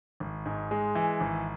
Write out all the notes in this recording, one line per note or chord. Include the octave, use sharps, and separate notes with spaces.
G#1
G#2
G#3
E3
G#1